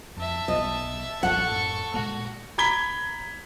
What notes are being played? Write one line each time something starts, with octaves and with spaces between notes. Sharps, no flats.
F2 E5 A5
B1 D#5
A#1 A2 A4 F#5 C#6
F#2 A2
A#2 G#3 A#3 F#4
A#5 B5 G#6 B6 G7